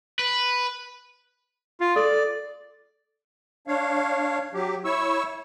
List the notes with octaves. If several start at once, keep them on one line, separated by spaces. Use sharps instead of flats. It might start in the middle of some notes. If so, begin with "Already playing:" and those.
B4
F4
A4 D5
D4 C#5 F5
F#3 G4
E4 C#5 C#6 E6